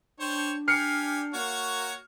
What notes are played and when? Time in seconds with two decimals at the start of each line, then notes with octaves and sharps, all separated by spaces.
0.20 D4 C5 C#5 G5
0.68 G4 G#5 F6 C7 C#7
1.34 A#3 F#4 C#5